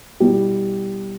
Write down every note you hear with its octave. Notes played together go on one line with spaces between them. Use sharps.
B2 G3 B3 E4 G4